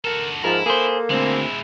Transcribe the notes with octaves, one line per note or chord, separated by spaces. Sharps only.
F#4 A4 A#4
G#2 F3 E4 A#4
A#3 G#4 A4 C5
D2 G#3 C4 E4